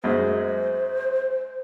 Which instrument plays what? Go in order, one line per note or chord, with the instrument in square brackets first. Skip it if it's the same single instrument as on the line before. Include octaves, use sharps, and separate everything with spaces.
[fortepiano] F#2 G#3 [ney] C5